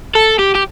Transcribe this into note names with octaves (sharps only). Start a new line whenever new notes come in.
A4
G4
G4